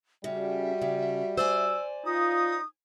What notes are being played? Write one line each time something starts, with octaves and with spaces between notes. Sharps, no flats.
C#3 G3 F#4 E5
C#3
C5 D5 G#5 E6
D#4 F4 D#6